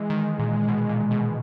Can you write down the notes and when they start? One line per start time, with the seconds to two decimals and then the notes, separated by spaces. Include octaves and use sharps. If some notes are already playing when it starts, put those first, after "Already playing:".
Already playing: E3 G#3
0.10 D#3
0.39 A#2
0.68 B2
0.89 A#2
1.11 B2